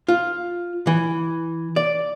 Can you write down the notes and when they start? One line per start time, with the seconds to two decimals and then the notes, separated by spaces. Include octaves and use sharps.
0.08 F4
0.87 E3
1.76 D5